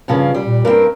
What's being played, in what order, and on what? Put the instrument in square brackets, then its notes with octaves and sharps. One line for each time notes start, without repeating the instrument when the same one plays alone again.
[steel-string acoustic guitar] G2 C#3 F3
G3
[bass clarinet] A#2
[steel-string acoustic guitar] G2 C4 [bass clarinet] A#4